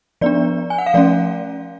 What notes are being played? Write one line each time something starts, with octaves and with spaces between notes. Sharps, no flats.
F3 B3 D4 D5
G#5
F#5
F5
F3 A3 C#4 D5